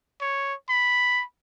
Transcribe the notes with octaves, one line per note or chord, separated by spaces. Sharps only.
C#5
B5